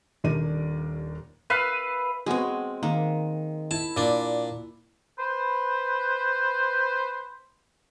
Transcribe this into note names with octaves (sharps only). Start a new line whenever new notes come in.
D#1 D#2 D4 A#4 D5 D#7
B4 E5 F5
G#3 B3 C4 F#4 G#4
D#3 A#3
E4 A5
A#2 D4
B4 C5